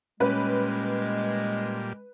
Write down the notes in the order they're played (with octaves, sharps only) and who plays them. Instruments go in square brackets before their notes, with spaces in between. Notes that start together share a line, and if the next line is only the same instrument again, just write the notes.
[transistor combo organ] A#2 G3 [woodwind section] G#3 [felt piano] C#4 [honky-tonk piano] B4